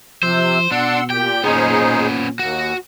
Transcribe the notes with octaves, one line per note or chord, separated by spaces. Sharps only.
C3 F3 C5 E6
B2 D4 F#5 C6 E6
A#2 G4 G5
A#2 B3 C#4 D#4 G#4 C5
D#2 F#4